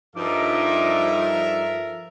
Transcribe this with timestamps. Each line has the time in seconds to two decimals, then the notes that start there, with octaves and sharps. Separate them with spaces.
0.16 G2 F3 D#4 A4 A#4 E5 D6